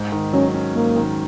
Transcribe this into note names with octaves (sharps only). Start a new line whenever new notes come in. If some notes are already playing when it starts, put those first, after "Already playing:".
Already playing: G#2
D#3
F#3 C#4
C#4
G#2 A#3
D#3